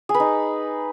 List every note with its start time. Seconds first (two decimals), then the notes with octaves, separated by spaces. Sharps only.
0.09 G#4
0.14 B4
0.20 D#4